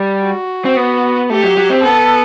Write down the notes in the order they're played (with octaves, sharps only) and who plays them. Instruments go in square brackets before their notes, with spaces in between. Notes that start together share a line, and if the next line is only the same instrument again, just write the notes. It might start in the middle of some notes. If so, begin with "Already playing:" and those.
Already playing: [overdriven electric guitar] G3
[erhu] F#4
[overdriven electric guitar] C4
B3
[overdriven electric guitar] A3 [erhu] G4
[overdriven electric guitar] F#3
F#3
C4
[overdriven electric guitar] B3 [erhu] A4